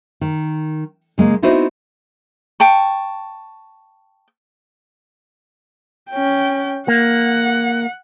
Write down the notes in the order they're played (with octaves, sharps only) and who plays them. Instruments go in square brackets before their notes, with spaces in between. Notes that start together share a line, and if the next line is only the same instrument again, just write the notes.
[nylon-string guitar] D#3
C#3 G#3 A#3
B3 C4 D#4 E4 F#4 C5
[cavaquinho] G5 A5 C#6
[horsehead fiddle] C#4 G5
[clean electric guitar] A#3 [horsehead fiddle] F#5